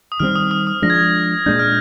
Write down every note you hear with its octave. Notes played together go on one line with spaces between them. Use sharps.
D#6
D#3 G3 C4 F6
D#6
D#6
D#6
F3 G#3 D4 A#6
G#6
A#6
A#2 G#3 D4 G6
F6